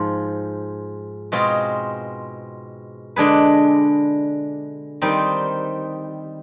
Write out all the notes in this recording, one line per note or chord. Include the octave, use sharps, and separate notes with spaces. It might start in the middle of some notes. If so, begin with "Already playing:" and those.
Already playing: G#2 F3 F4
B2 G#3 C4 F4 G#4
D3 G#3 D4 G#4 B4
D#3 G3 C4 D#4